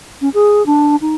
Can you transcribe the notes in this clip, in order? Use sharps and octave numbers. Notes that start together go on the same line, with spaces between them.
C#4
G#4
D4
D#4